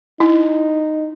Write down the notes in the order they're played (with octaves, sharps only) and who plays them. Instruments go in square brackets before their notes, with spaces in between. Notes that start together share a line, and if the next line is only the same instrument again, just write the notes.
[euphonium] D#4 [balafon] E4